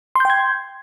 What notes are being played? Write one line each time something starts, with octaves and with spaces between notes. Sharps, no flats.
G5 C6 G6 G#6